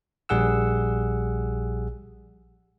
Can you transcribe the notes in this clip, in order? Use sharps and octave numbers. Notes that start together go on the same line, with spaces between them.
A#1 G3 G#4 F#5 E6